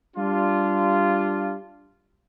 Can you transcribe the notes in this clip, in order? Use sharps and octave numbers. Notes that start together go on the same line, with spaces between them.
G3 D4 F4